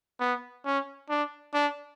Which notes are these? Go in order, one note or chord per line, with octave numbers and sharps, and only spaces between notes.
B3
C#4
D4
D4